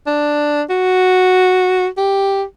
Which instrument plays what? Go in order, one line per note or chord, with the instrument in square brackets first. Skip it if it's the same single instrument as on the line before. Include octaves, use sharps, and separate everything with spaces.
[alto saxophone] D4
F#4
G4